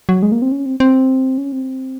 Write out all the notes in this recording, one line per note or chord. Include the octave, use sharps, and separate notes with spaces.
F#3
G#3
A#3
C4
C#4
C4
C4
C#4
C4